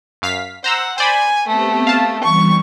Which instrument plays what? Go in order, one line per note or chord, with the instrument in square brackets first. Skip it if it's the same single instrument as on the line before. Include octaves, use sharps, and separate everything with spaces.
[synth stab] F#2 F5 B6
[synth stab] C5 A#5 E6 [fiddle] F#5
[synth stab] C5 D5 B5 [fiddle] G#5
[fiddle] A3 [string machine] B3 C4 G4
[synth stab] F5 A5
[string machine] E3 G3 [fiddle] C#6